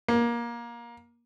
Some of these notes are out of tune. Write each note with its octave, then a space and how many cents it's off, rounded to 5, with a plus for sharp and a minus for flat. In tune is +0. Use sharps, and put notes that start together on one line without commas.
A#3 +20